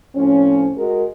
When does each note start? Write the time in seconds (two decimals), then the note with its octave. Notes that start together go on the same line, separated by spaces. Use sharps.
0.16 A2 F3 C4 C#4
0.77 G#3 F#4 G#4 A#4